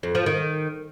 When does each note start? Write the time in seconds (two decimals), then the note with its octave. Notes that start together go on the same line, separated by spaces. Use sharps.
0.03 F2
0.15 F3
0.26 D#3